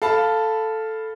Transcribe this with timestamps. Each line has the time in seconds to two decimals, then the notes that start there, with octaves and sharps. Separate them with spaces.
0.02 A4 F5 A5 B5